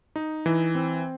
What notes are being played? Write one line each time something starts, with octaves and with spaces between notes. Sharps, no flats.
D#4
E3
C4